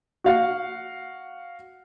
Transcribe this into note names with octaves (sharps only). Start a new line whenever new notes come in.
F#4 F5 F#5